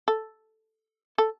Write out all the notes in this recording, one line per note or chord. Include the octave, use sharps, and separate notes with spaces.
A4
A4